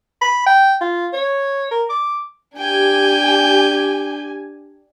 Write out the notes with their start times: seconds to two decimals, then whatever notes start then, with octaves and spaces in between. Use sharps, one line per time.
0.21 B5
0.46 G5
0.81 F4
1.13 C#5
1.71 A#4
1.90 D6
2.58 D4 G4 G5 G#5